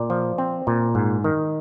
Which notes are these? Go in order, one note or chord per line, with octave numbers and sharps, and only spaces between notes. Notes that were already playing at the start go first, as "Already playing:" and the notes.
Already playing: A#2 D5
F3
C4
A#2
G#2
D#3